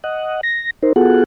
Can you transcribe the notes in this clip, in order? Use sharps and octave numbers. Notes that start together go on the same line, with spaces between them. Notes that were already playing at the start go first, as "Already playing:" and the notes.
D#5 F#5
A#6
D#4 A#4 C5
B3 F4 F#4 G#4 A4 F#5